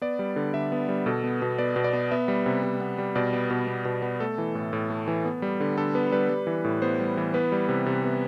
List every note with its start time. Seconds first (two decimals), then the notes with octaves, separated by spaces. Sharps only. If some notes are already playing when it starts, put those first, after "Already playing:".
0.02 B3 D5
0.19 G3
0.36 D3
0.54 D3 E5
0.72 B3
0.89 G3
1.06 B2 A4
1.24 B3
1.42 B2
1.58 B3 D5
1.76 B2
1.84 D5
1.93 B3
2.11 B3 E5
2.28 G3
2.46 C3
2.63 C3
2.81 B3
2.98 G3
3.15 B2 D5
3.33 B3
3.50 B2
3.67 B3
3.85 B2
4.02 B3
4.20 A3 A4
4.38 E3
4.55 A2
4.73 A2
4.90 A3
5.08 E3
5.25 B3
5.42 G3
5.60 D3
5.77 D3 A4
5.95 B3 B4
6.12 G3 B4
6.29 G3
6.47 E3
6.64 A2
6.82 B3 C5
6.99 G3
7.17 E3
7.34 B3 B4
7.52 G3
7.69 C3
7.86 C3
8.04 B3